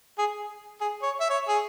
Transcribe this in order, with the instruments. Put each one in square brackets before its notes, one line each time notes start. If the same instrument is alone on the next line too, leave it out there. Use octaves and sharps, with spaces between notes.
[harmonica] G#4
G#4
C#5
E5
C#5
G#4